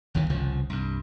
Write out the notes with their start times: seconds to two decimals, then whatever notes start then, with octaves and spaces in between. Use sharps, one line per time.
0.15 G1 D#2 D#3 E3
0.30 G1 C2 C#3 F3
0.70 C2 G2